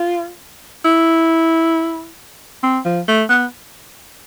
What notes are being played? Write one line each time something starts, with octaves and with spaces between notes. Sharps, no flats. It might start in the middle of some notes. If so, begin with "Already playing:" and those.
Already playing: F4
E4
C4
F3
A3
B3